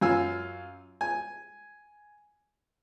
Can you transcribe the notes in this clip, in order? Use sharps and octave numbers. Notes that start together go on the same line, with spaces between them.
F#2 F4 G#5 E6
G#5